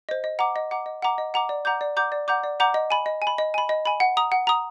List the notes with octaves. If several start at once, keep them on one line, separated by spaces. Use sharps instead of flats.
C5 D#5
D#5
F#5 A#5 D6
D#5
F#5 A#5 D6
D#5
F#5 A#5 D6
D#5
F#5 A#5 D6
D5
F#5 A#5 D6 G6
D5
F#5 A#5 D6 G6
D5
F#5 A#5 D6 G6
D5
F#5 A#5 D6 G6
D#5
G#5 B5
D#5
G#5
B5
D#5
G#5 B5
D#5
G#5 B5
F#5
A#5 D#6
F#5
A#5 D#6